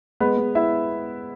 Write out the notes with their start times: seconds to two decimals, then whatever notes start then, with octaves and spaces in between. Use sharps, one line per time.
0.20 G#3 B3 B4
0.38 G#3
0.55 B3 E4 E5